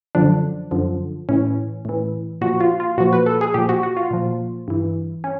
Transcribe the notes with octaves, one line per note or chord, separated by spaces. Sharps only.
F#2 D3 F3 D4
F#2 D3 F3
A2 E3 C#4
A2 E3
A#2 F3 F#4
F4
F4
A#2 F3 F#4
B4
A4
G#4
A#2 F3 G4
F#4
F#4
F4
A#2 F3
G2 E3
C#4